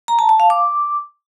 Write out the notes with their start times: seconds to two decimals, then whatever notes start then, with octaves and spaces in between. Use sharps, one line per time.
0.08 A#5
0.19 A5
0.29 A5
0.40 F5
0.50 D6